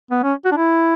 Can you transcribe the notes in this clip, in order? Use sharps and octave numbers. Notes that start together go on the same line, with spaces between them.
B3
C#4
F#4
D4
E4